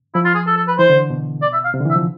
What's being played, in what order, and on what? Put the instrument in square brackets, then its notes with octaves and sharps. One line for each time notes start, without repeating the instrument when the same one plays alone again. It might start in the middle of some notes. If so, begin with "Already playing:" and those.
[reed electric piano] F3 [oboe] E4
[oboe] F4
G#4
A4
A4
B4
[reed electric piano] E3 [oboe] C5
[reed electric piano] D3
B2
[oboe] D5
E5
F5
[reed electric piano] C3
D3
E3
[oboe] E5
[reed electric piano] F3